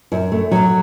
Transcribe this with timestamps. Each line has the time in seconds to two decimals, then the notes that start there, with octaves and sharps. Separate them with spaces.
0.12 F#2
0.32 A3
0.51 F#3